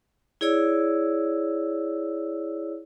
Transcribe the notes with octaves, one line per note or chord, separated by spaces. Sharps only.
E4 G#4 C#5 D5 E6